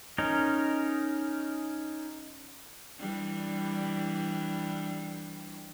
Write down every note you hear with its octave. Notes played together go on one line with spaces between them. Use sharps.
C#4 D#4 A#4
E3 G3 D4